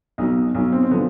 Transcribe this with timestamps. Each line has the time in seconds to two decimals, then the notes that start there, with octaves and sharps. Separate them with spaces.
0.18 B1 B2 D#4
0.55 B1 D#4
0.59 B2
0.72 C4
0.83 C4
0.91 D3 F3 B3